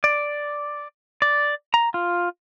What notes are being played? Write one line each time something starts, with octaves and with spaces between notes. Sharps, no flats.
D5
D5
A#5
F4